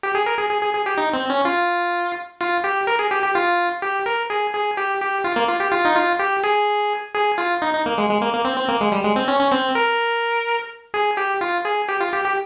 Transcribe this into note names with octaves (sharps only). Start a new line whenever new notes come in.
G4
G#4
A#4
G#4
G#4
G#4
G#4
G4
D#4
C4
C#4
F4
F4
G4
A#4
G#4
G4
G4
F4
G4
A#4
G#4
G#4
G4
G4
F4
A#3
F4
G4
F4
D#4
F4
G4
G#4
G#4
F4
D#4
D#4
A#3
G#3
G#3
A#3
A#3
C4
C4
A#3
G#3
G3
G#3
C4
C#4
C#4
C4
A#4
G#4
G4
F4
G#4
G4
F4
G4
G4